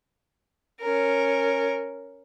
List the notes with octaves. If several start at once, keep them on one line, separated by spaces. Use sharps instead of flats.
C#4 A#4